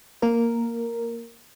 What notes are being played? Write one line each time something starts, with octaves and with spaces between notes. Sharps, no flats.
A#3 A#4